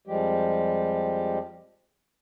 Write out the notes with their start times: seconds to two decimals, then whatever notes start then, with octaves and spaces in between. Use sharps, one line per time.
0.07 F2 F3 G3 G#3 G4